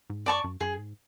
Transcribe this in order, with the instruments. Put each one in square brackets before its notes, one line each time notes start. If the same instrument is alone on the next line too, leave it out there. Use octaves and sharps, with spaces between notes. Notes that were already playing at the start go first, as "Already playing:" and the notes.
[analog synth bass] G#2
[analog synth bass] F#2 [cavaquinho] D5 A5 C#6
[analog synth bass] F#2
[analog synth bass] F#2 [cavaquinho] G#4
[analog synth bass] G#2